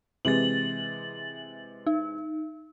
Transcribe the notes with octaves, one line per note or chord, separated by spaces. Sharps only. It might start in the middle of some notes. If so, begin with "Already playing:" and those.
C3 E3 G#3 A6 F#7
D#4